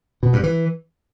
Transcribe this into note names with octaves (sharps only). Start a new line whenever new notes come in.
B2
G2
E3